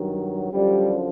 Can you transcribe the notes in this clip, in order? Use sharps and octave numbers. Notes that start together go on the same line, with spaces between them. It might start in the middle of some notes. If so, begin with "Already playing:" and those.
Already playing: G2 D#3 F#3
F#2 D3 F3 G3